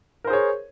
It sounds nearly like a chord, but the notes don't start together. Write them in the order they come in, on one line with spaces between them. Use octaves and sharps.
A#4 C5 G#4 C#5